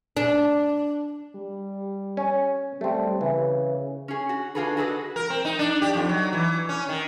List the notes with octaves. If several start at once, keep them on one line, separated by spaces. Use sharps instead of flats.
D4
G3
C#4
G3 A3 C4
C#3 E3
C#4 G#4
F#4
D4 F4 F#4 G#4 A4 B4
F#4 G#4 A4 B4 D5 D#5
A#4
C4
D#4
D4
G4
F2
F#3
E3
C#4
D#3